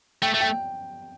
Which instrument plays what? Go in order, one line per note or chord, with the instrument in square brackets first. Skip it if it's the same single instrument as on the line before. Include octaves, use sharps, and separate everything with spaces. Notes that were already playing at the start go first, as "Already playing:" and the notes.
[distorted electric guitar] A3 [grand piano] G5
[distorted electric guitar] A3
[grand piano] G5